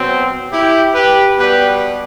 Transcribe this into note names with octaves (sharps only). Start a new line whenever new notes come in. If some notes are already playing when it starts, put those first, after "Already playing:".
Already playing: B2 F#3 C4
E4 G4
G4 B4
B2 G3 G4 B4